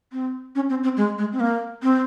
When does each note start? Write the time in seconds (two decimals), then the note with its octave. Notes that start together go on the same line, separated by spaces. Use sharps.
0.13 C4
0.55 C#4
0.70 C4
0.83 C4
0.97 G#3
1.18 G#3
1.32 C4
1.40 A#3
1.83 C4